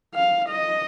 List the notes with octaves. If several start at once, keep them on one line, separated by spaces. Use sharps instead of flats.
F5
D#5